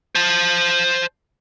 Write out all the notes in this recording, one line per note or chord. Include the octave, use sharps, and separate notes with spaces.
C5 A5